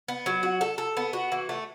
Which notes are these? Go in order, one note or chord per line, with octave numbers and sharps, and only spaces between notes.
B3
F#3
F#4
A4
A4
B3
F#4
E3
A3